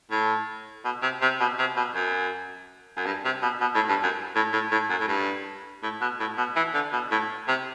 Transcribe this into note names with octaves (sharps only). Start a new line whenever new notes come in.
A2
B2
C3
C3
B2
C3
B2
F#2
F#2
G2
C3
B2
B2
A2
G2
F#2
A2
A2
A2
F#2
A2
G2
A2
B2
A2
B2
E3
D3
B2
A2
C3